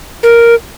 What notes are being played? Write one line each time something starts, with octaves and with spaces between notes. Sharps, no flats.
A#4